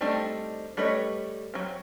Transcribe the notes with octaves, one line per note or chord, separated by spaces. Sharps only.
G3 A3 C4 D4 D#4
G3 A3 B4 C#5 D#5
F#3 C4